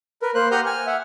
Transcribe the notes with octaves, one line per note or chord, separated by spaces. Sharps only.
A#4 B4
A#3 C5 F#6
G4 F#5 A#5 D#6 F6 G6
G#5 F6
E5 F#5